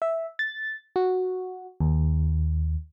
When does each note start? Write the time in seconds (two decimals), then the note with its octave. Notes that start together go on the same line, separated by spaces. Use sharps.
0.02 E5
0.39 A6
0.96 F#4
1.80 D#2